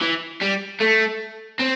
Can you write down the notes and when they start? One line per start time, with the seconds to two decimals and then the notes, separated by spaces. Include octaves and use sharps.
0.02 E3
0.41 G3
0.80 A3
1.60 C4